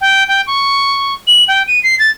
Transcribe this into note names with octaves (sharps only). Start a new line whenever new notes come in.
G5
G5
C#6
F#7
G5
D#7
C7
A6